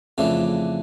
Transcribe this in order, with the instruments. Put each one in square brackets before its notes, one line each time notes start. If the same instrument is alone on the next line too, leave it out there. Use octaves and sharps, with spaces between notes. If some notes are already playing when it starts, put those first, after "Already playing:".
[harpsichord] F2 C#3 E3 A3 D4